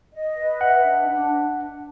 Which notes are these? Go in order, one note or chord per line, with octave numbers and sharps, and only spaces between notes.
D#5
B4
E5 F#5
D4
D4